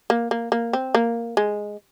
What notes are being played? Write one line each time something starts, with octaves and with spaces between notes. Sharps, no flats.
A#3
A#3
A#3
C4
A#3
G#3